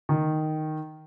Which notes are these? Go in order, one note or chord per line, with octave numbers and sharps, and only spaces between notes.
D#3